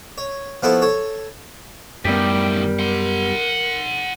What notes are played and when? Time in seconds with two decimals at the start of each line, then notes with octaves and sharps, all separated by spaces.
0.18 C#5
0.63 F3 B3 E4 A4 C#6
0.82 A4 C#5
2.05 F#2 A2 D#3 G3 B3 G4 A#4
2.79 F#5 C6